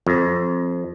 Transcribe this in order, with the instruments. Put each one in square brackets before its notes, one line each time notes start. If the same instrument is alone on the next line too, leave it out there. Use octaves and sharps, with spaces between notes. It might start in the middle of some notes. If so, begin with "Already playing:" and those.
[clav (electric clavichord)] F2